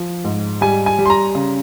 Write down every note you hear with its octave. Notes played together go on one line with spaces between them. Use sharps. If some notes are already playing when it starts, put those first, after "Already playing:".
Already playing: F3
G#2
G3 G#5
G#5
G3
C6
A#5
C#3